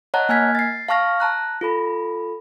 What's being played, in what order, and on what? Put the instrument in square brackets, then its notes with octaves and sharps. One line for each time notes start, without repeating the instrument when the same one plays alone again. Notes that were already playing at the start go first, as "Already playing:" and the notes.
[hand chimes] C#5 D#5 F#5 A5 A#5 F#6
A#3 G#5 F6 G#6 B6
A6 C7
F5 A5 C#6 F6 A#6
A5 A#5 F#6
F4 A4 B5